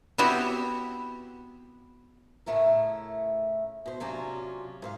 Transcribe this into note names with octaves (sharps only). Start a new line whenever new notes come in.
B3 C4 E4 F#4 G4
A2 C#3 A3 E4 A#4
B2 C5
C3 F#3 C#4 D4 F4
G#2 C5 F5